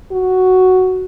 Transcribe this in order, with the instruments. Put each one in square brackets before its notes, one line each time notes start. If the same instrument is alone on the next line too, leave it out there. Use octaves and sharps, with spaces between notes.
[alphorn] F#4